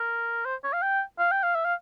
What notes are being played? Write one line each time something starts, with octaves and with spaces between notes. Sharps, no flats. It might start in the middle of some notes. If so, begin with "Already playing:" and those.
Already playing: A#4
C5
C#5
F5
G5
F5
G5
F5
E5
F5